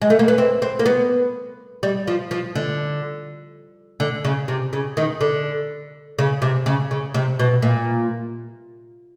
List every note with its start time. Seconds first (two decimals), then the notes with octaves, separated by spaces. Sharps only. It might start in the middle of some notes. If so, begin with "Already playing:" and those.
0.02 G#3
0.10 A3
0.19 A#3
0.28 B3
0.38 C4
0.62 C4
0.79 A#3
0.86 B3
1.83 G3
2.07 F3
2.31 F3
2.55 D3
4.00 D3
4.25 C#3
4.48 C3
4.73 C#3
4.97 D#3
5.21 D3
6.19 C#3
6.42 C3
6.66 C#3
6.91 C#3
7.14 C3
7.39 B2
7.62 A#2